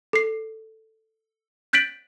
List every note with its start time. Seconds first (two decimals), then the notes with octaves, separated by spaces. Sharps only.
0.13 A4 C7
1.73 F#6 G6 A6 B6 D7 F#7